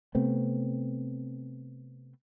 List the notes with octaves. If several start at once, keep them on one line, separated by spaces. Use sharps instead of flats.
C3 A3 B3 C4